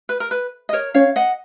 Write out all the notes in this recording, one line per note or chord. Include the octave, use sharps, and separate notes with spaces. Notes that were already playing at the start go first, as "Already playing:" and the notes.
B4
A#4
B4
D#5
A#4 C#5
C#4 C#5 F5
D#5 F#5